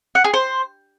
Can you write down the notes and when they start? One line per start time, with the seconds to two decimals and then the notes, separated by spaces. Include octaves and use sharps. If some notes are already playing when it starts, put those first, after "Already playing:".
0.15 F#5
0.24 G#4
0.34 C5